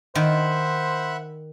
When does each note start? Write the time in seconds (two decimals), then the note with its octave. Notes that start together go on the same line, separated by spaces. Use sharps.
0.15 D#3 C5 E5 F#5 B5